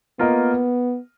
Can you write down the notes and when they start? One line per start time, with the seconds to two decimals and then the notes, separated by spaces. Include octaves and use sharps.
0.19 A#3 B3 F4 A#4 D#5